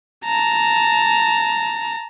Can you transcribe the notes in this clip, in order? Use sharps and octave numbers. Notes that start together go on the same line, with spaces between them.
A5 A#5